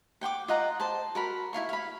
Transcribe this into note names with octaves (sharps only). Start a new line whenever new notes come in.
F#5 G5 C6 D6
F4 D#5 F#5 A#5
C5 A5
F#4 A#4 B5
E4 F4 F5 C#6
F5 B5